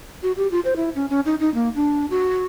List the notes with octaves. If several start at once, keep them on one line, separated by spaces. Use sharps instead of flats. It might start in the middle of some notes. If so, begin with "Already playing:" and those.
F#4
G4
F4
C5
E4
C#4
C#4
D#4
D#4
A#3
D4
F#4